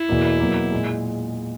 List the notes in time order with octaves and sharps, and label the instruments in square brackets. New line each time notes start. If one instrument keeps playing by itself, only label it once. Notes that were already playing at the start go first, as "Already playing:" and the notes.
Already playing: [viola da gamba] E4
[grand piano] E2 B2 A#3
B2 F#3 A#3
A#2 G#3